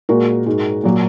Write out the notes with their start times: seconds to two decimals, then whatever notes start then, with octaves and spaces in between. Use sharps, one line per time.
0.09 A#2 G#3 F#4 A#4
0.46 G#2 G#3
0.84 A#2 F#3 A#3